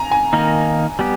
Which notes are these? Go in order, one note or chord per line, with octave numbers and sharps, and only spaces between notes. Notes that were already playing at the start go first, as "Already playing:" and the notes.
Already playing: G#5 A#5
G#5
D#3 A#3 D#4 A#4
G3 B3 G4